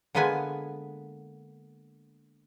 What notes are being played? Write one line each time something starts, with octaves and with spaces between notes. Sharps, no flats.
D3 G#3 A#3 B3 B4 G#5